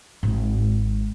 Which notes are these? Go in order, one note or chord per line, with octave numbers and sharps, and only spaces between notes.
G#1 G#2